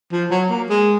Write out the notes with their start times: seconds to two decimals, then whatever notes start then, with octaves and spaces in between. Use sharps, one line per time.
0.12 F3
0.31 F#3
0.50 A#3
0.69 G#3